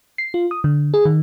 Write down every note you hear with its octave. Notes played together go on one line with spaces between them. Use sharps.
C7
F4
D#6
D3
G#4
D#3